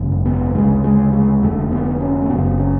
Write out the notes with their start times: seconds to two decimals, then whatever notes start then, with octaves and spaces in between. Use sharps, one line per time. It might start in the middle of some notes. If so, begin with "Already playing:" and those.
Already playing: G#1 F#2 C#3
0.26 B3
0.55 D2 C#3 G#3
0.84 G#3
1.13 G#3
1.42 F1 F2 D3 A3
1.71 B3
2.00 C#4
2.22 A3
2.29 F#1 F#2 C#3 B3
2.59 C#4